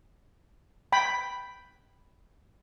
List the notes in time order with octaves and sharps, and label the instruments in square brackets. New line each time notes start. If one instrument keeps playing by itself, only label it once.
[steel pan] G5 B5